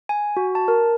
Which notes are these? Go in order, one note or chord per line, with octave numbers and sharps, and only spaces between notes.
G#5
F#4
A5
A#4